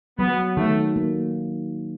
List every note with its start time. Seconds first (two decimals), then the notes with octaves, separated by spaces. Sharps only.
0.19 F#3 B3
0.57 D#3 A3
0.96 A#3